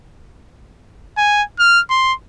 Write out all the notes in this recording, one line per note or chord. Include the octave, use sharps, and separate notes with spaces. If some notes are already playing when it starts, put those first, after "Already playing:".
G#5
F6
C6